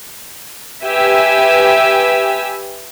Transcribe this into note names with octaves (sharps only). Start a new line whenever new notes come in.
G4 B4 E5 G#5 E6